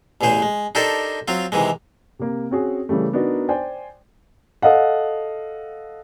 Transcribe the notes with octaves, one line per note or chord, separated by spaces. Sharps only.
A1 E2 C#3 G#4 C5
G#3
D4 D#4 G4 A4 A#4 C5
F#3 C4 F4
C3 D#3 E3 G#3
C3 A#3
C4 C#4 F#4 G#4
C#3 E3 G3 A3
B3 D4 D#4 F#4 A#4
C5 D5 G5 G#5
A4 D#5 F5 F#5